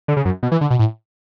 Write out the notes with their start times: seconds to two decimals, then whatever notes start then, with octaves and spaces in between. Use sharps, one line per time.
0.08 D3
0.17 C#3
0.25 F#2
0.43 B2
0.52 E3
0.61 D3
0.70 B2
0.79 A2